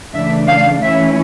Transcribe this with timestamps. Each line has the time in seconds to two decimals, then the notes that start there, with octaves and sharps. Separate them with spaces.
0.12 C#3 E3 A3 D4 E5
0.47 F5
0.81 E3 A3 C#4 E4 E5